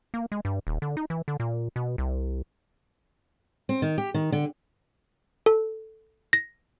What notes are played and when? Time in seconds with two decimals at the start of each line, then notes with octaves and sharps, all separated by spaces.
0.14 A#3
0.32 G#3
0.45 G2
0.67 D#1
0.82 D3
0.97 D#4
1.10 E3
1.28 D3
1.40 A#2
1.76 B2
1.98 C2
3.69 C4
3.82 D#3
3.98 G4
4.14 D#3
4.32 D3
5.46 A4
6.33 A#6